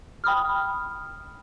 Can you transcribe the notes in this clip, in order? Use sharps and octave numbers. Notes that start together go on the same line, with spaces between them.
G5 B5 D#6 F6